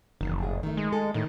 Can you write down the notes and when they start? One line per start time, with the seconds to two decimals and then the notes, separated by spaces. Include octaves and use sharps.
0.21 F#1 E2 D#3
0.39 F2 A2 G#4
0.63 D#3 A3
0.77 G#3
0.93 A4
1.14 A2 D#3